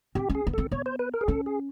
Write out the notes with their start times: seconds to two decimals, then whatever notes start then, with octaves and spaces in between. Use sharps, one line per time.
0.15 C4 G4
0.30 C#4
0.35 G#4
0.47 B3
0.54 C4 A4
0.72 B3 C#5
0.86 C5
0.99 B4
1.14 A#4
1.21 G#4
1.28 C#4 A4
1.46 G#4